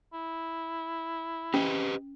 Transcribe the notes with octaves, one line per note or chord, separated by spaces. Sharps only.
E4
C#4 G4 B4 D#5